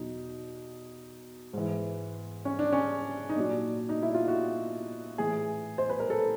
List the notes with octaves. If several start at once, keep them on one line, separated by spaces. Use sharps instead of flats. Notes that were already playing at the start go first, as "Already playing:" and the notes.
Already playing: E2 B2 F#3 D#4
G#2 E3
C#4
D4
C#4
D#4
A#2 F#3 D4
D#4
E4
F4
F#4
A2 E3 G#4
C5
B4
A#4
A4